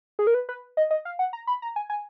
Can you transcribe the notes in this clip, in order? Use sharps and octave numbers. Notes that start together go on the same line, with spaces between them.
G#4
A#4
B4
B4
D#5
D#5
F5
F#5
A#5
B5
A#5
G#5
G#5